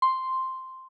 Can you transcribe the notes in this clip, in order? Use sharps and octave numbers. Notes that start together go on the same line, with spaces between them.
C6